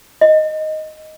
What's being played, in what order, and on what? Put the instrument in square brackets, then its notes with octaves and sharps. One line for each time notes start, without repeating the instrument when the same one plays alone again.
[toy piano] D#5